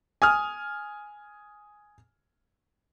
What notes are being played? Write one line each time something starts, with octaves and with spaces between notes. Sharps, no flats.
G#5 D#6 F6